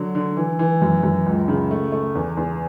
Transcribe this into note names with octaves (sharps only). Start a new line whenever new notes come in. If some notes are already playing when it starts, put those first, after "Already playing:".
Already playing: D3 F#3
D3
E3
E3
F#2
F#2
C#2
C#3
A3
A3
E2
E2